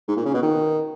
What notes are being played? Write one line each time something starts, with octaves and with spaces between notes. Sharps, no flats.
G#2
A#2
C#3
B2
D#3